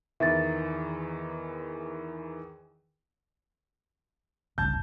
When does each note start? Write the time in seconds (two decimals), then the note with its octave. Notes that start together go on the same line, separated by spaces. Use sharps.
0.20 E2 D#3 E3 E5 A6
4.58 G1 C#2 A5 G6